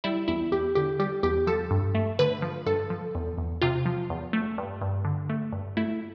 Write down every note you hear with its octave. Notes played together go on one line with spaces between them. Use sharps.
G3 E4
E2 E4
E2 G4
D3 G4
G3 G4
E2 G4
F3 A4
G2
A3
D3 B4
F3
G2 A4
F3
E2
E2
C3 F4
F3
E2
A3
G2
G2
D3
A3
G2
A3 E4